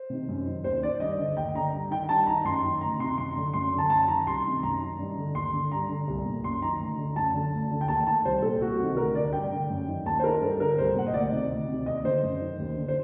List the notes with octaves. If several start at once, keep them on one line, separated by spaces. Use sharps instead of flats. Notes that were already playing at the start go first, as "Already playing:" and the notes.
Already playing: C5
C3 D#3
F#2
D#3
D#2 C5
D#3 D5
G2 D#5
D3
D#2 G5
D3 A#5
G2
D#3 G5
G2 A5
D#3 A#5
F#2 C6
D#3
D2 A#5
C3 D#3 C6
F#2 C6
D3
F#2 C6
D3
A5
F#2 A5
D#3 A#5
C2 C6
C3 D#3
F#2 A#5
D#3
G2
D3
D#2 C6
D3
G2 A#5
D3
C2
A#2
F#2 C6
D#3 A#5
D2
D3
F#2 A5
D3
D2
D3
G5
D#2 A5
D#3 A5
C2 C5
A#2 A4
C2 F#4
C3 D#3 F#4
D2 A#4
D3 D5
G2 G5
D3
F#2
D#3
D#2 A5
C5
D#3 A#4
G2 A4
D3 A#4
C2 C5
A#2 F#5
D#5
D2 D5
C3 D#3
D2
C3 D#3
D#2 D#5
D3 C5
F#2
D#3
D#2
D3
C5